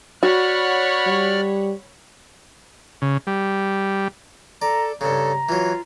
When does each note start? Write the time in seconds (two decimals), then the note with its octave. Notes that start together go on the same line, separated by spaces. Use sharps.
0.23 F#4 C#5 D5 F#5 B5 F6
1.07 G3
3.02 C#3
3.27 G3
4.62 A4 D5 A#5
5.01 G2 C#3 A4 A#5
5.49 E3 F#3 F4